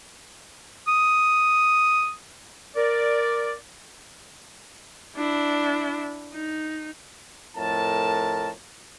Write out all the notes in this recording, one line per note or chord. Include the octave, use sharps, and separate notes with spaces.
D#6
A#4 D5
D4 E4
D#4
F2 A2 A#4 A5